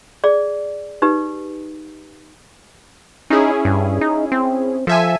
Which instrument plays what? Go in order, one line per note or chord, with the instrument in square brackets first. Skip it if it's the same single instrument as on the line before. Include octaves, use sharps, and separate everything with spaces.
[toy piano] G#4 D5
D#4 G4 B4
[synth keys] C#4 E4 G#4 [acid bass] D#4
[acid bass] G2
D#4
C4
[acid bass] F3 [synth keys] A4 E5 G#5